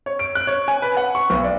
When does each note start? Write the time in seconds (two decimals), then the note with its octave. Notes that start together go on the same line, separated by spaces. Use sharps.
0.06 C#5
0.19 D7
0.35 F#6
0.47 C#5
0.68 G#5
0.82 B4
0.97 F#5
1.15 C#6
1.30 B1
1.44 D5